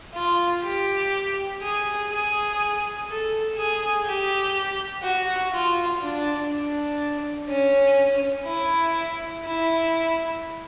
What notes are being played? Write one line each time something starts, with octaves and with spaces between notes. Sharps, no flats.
F4
G4
G#4
G#4
A4
G#4
G4
F#4
F4
D4
D4
C#4
E4
E4